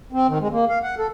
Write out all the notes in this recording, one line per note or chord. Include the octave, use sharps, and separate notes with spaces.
C4
D#3
G#3
A#3
F5
F#5
A4